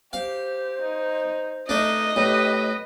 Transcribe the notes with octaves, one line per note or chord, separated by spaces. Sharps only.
G4 C5 F5
D#4
A3 D4 D#4 D#5
A2 G4 B4